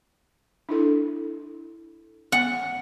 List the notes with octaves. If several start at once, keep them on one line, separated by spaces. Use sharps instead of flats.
D4 E4 A4
B3 F#5